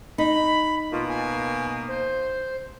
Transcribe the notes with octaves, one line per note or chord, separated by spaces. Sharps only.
D#4 B5
B2 A#3 F4
G#5
C5